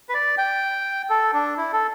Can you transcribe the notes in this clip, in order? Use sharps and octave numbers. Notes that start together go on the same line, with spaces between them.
B4
D5
G5
A4
D4
E4
A4